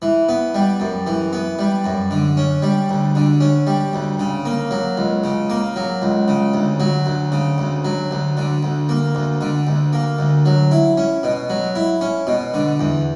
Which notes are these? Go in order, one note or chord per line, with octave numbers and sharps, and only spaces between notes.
E3
B3
G3
F#2
E3
B3
G3
F#2
D3
C#4
G3
D2
D3
C#4
G3
D2
C#3
A#3
F#3
C#2
C#3
A#3
F#3
C#2
C#3
D2
F#3
D2
C#3
D2
F#3
D2
D3
D2
A#3
D2
D3
D2
A#3
D2
F#3
E4
C#4
B2
F#3
E4
C#4
B2
D3
E2